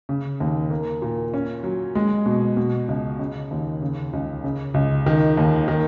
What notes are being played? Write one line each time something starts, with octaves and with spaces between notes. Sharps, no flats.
C#3
D#2
A#3
A#2
C#4
F#3
G#3
B2
B2
C#2
C#3
D#2
C#3
C#2
C#3
C#2
D#3
D#2
D#3